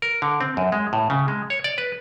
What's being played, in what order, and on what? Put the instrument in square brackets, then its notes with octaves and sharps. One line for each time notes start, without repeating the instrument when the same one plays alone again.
[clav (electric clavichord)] A#4
D3
C4
F#2
G#3
A2
C#3
G#3
C#5
D5
B4